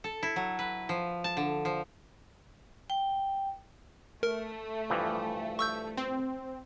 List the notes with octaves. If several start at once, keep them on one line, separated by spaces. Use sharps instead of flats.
A4
E4
F#3
B4
F3
A5
D3
F3
G5
A3 A#4
G2 E3 F3
C#6 E6 G6
C4